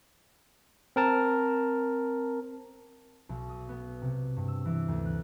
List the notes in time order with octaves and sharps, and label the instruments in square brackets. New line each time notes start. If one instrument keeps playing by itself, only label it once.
[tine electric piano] C4 A#4 A5
[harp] B1
D#6
B3
C3
G2
E6
E3
D2
F#6